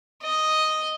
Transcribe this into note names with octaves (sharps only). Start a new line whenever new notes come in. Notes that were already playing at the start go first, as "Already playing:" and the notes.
D#5